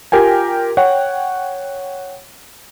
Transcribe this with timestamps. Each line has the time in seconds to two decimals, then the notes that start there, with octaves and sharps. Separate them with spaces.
0.12 F4 G4 A#4 G5 G#5
0.77 C#5 F#5 G5